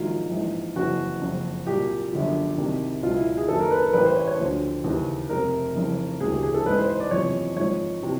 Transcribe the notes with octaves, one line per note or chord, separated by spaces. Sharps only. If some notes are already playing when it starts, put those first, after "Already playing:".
Already playing: A#1 G#2 D#3 F#3 F4
A#1 G#2 E3
F#1 F2 C#3 E3 F#4
F#1 F2 C#3
C2 A#2 F#3 G4
G1 F#2 D3 F3
C2 C3 D#3 F#3
C#2 B2 F#3 F4
E4
G#4
F#1 F#2 D#3 F#3 A4
A#4
B4
A#4
A1 A2 E3 B4
C5
C#5
C#5
D2 D3 F3 C5
D#2 C#3 E3
F1 F2 C3 A#4
F1 F2 C#3 E3
E1 D2 C#3 E3 G#4
G4
G#4
A4
A1 G#2 E3 B4
C5
C5
D5
F#1 E2 C3 F3 C#5
G#1 G#2 F3 C#5
C3 E3